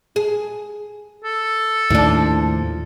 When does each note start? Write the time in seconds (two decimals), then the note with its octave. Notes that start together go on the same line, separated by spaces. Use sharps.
0.16 G#4
1.24 A4
1.90 D#2 A2 F3 D4